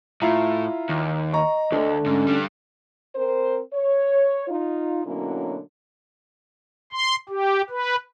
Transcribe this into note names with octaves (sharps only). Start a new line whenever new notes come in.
A2 E4 F4 A#5
D#2
D#5 A#5 C#6
D2 D3 A3
G#2 C#4
G3 D4
C4 A#4 C5
C#5
D#4 F4
B2 D3 F#3 A#3 C#4 E4
C6
G4
B4